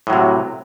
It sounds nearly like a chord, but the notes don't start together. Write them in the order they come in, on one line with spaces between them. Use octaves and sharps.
A2 F#3 C3